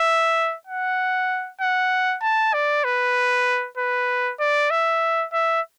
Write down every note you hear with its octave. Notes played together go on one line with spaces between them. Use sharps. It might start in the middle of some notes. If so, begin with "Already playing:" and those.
Already playing: E5
F#5
F#5
A5
D5
B4
B4
D5
E5
E5